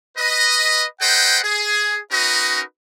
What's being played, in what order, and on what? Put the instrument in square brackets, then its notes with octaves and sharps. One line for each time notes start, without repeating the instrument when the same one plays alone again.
[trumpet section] B4 D#5
A4 B4 C5 D#5 F#5 G5
G#4
C#4 D#4 F#4 A#4 B4 D#5